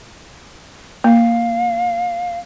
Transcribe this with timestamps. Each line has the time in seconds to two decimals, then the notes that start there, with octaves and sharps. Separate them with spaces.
1.04 A#3 F5